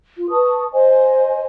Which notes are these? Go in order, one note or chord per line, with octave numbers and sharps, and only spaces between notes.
F4
B4 A5 C#6 D#6
C5 D#5 G#5